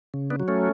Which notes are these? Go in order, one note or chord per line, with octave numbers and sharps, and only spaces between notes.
C#3
B3 D4
F#3
A3 C#4